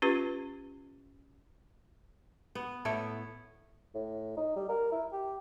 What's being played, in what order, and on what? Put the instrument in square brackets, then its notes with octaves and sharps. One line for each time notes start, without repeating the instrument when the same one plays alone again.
[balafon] C#4 F4 G4 B4
[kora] B3
A2 A3 B3 E4
[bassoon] A2
D#4
G3
A#4
E4
G4